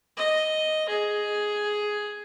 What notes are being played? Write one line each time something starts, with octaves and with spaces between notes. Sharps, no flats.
D#5
G#4